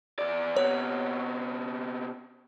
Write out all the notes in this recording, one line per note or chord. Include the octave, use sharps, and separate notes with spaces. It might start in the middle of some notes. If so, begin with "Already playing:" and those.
E2 D5
C3 B3 C#5